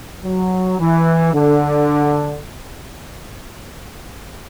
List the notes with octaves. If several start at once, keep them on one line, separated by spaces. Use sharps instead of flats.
F#3
E3
D3